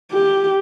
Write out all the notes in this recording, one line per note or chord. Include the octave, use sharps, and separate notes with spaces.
G4